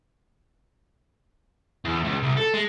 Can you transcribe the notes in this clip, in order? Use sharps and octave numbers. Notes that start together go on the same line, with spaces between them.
E2
C#2
C2
A4
G#3